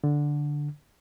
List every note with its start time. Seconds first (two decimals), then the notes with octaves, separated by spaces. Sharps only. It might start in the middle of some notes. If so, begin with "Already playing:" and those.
0.04 D3